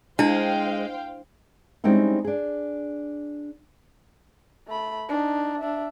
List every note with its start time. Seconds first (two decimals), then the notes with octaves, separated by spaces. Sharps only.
0.19 G#3 D4 E4 C5 F5 G5
1.84 G3 G#3 C4 C#4 D#4 E4
2.25 D4 G#4
4.68 A3 B5
5.09 D4 D#4
5.60 D4 E5